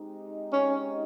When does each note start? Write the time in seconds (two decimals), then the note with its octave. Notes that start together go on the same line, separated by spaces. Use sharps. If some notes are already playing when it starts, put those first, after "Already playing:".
Already playing: G#3 C4 D#4 G4
0.53 C#4